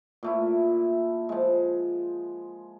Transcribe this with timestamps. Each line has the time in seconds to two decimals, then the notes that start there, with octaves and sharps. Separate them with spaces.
0.23 A#2 A3 E4
1.29 F3 G#3